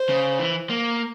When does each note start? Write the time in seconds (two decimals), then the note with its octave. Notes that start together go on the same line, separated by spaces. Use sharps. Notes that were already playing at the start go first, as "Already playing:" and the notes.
Already playing: C5
0.09 C#3
0.39 E3
0.70 A#3